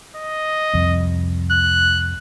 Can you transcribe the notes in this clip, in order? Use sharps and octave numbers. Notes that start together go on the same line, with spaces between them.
D#5
C2 F2
F#6